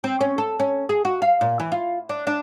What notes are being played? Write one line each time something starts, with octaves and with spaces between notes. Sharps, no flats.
C4
C#4
A4
C#4
G#4
F#4
F5
A#2
E3
F4
D4
D4